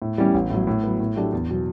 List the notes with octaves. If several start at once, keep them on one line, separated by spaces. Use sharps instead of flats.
A2
E3 G3 C#4 G4
A1
A2 F#3
A2
F#3 B3
A2
F#3 A3 D4 G4
E2
B2 F#3